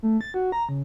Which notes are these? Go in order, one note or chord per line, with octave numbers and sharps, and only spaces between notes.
A3
A6
F#4
A#5
C#3